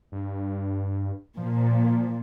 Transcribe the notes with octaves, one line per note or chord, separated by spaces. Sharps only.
G2
A#2 F3